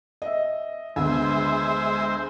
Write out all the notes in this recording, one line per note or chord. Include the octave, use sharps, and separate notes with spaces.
D#5 E5
D2 G#3 B3 G#4 C5 E5